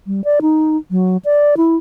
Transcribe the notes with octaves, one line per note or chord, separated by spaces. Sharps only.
G3
D5
D#4
F#3
D5
E4